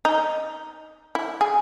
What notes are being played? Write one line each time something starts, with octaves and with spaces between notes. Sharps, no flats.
D#4
E4
G#4